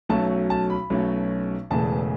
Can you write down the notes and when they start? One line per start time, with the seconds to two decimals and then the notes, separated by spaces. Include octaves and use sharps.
0.09 B1 B2 F#3 A3 C#4 A5
0.50 A5
0.70 B5
0.90 B1 B2 F#3 A3 C#4
1.71 E1 E2 C#3 E3 A3 A5